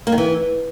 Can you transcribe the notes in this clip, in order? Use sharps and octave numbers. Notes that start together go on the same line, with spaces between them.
A#3
D#3
E3